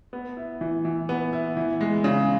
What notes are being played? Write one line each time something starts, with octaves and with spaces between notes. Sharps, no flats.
B3
E4
E3
E3
B3
E4
E3
G#3
C#3